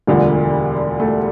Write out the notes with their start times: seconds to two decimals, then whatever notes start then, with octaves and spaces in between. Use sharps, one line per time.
0.07 E1 D2 D3 F3 G3
1.00 A3